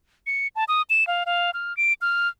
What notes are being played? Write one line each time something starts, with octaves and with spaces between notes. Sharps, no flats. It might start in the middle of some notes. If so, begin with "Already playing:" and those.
C#7
A5
D#6
E7
F5
F5
F6
D7
F6